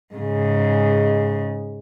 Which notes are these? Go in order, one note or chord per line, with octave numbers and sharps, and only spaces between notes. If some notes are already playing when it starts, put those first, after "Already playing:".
G#2 C#3